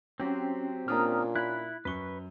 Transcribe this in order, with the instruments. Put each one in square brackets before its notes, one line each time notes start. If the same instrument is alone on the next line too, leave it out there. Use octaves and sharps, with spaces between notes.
[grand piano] F#3 F#4 [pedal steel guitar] C4 G4 C5 [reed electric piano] C#4
[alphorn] A#2 [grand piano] A#3 C#4 D4 [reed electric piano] A#5 D#6 F6
[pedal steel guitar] E4 B5 [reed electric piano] F#6
[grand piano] F#2 G7 [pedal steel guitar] B4 C#6